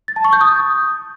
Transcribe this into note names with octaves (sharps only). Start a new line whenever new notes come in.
A6
A5
C#6
G6
D#6